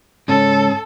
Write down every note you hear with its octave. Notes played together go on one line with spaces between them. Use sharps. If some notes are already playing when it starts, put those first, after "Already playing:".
G#2 C#3 C#4 A4